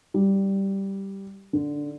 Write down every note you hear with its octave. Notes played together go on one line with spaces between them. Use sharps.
G3
D3